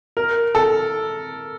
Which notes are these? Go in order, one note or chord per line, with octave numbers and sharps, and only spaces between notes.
A#4
A4